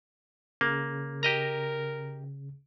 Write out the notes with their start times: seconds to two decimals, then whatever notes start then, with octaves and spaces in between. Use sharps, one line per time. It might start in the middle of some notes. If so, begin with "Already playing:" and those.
0.61 C#3 A#3
1.23 G4 A#4 D#5 A#5